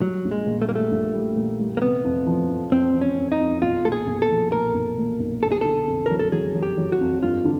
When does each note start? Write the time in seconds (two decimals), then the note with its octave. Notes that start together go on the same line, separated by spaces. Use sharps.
0.01 F#3 G3
0.25 A#1
0.31 G#3
0.47 A#2
0.62 A3
0.69 G3 A#3
0.75 A3
0.91 A#1
1.14 G3
1.36 A#2
1.59 G3
1.77 A#3
1.82 C3 B3
2.04 F2
2.26 F3
2.49 F2
2.71 F2 C4
2.94 F2
3.01 C#4
3.17 F2
3.32 D#4
3.40 F2
3.62 B1 F4
3.85 A#2 A4
3.92 G#4
4.07 B1
4.22 A4
4.30 F3
4.52 A#2 A#4
4.74 B1
4.98 A#2
5.20 B1
5.43 G1 A4
5.52 G#4
5.61 D3 A4
5.87 F2
6.06 F#3 A#4
6.19 A4
6.32 F#3 G#4
6.55 F#3
6.63 G4
6.77 F#3
6.92 F#4
7.01 F2
7.23 G2 F4
7.44 D3